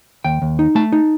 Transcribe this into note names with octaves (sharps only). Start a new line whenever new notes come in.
D#2 G5
D#2
D#4
A3 A5
D#4